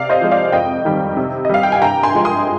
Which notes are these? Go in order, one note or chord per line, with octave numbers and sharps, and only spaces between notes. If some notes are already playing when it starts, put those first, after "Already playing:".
Already playing: C3 D5 F5
C5 D#5
F3 G#3
D5 F5
F2 D#5 G5
D#3 G3
C3
D#5
G3 F5
G5
G#5
G2 G5 A#5
G#5 C6
F3 G#3
C6 D#6